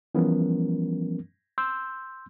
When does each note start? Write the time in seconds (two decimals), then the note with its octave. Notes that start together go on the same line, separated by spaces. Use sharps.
0.15 E3 F3 G3 B3 C#4 A#4
1.58 C6 E6 G6